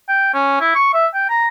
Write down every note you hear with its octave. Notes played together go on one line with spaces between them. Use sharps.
G5
C#4
E4
C#6
E5
G5
A#5